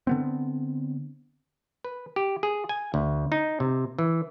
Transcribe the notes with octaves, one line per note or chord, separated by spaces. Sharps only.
D3 B3 C4
B4
G4
G#4
G#5
D2
D#4
C3
E3